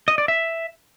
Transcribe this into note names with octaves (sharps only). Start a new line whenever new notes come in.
D#5
D5
E5